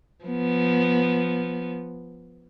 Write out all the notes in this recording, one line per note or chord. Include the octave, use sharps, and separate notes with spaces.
F3 B3